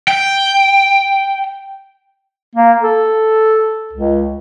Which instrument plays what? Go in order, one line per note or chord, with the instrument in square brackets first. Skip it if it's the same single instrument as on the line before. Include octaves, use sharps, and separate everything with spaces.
[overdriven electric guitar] G5
[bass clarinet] A#3
A4
C#2